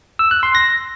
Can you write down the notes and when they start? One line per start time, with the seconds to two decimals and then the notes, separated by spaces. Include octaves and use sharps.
0.19 E6
0.31 F#6
0.43 C6
0.55 A#6